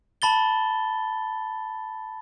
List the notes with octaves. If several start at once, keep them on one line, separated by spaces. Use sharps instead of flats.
A5 B5 A6 G7